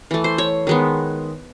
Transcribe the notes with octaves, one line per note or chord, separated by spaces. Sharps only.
E3 A3
C5
C#5
D#3 G#3 B3